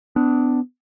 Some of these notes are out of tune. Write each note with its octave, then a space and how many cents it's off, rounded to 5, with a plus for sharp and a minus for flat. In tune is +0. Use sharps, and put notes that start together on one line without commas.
B3 +35 D4 +0